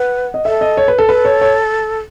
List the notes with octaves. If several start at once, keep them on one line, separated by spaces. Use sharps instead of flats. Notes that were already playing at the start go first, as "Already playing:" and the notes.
Already playing: B4 F#5
D#5
A4 E5
D#5
C#5
B4
A4
A4 B4
C#5
C#5